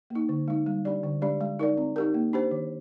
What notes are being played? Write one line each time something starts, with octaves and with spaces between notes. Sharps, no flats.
A#3 D#4
D3
G#3 D#4
G3
D4 G4 D5
D3
G#3 D4 G4 D5
G#3
D#4 A#4 D5
C4
D#4 G4 A#4
A#3
D4 G4 C5
D#3